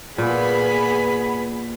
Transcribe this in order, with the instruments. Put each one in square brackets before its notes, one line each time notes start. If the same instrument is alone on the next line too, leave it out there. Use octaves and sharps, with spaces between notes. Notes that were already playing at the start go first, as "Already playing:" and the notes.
[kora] A#2 [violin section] B3 G#4 B5